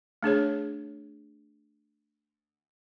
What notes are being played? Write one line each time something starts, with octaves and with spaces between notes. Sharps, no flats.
A3 D4 G#4 C#5